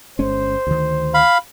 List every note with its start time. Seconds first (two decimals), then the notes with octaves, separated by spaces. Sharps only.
0.19 G1 G#3 C#4 C5
0.67 D2 D#3
1.14 F5 B5